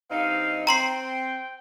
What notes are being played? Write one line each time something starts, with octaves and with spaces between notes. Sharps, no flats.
G2 C4 D#4 F5
C4 G5 A#5 C6 C7